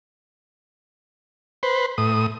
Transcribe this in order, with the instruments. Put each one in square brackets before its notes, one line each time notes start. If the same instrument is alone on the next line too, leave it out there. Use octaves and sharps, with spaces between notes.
[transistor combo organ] B4 C5
A2 D#6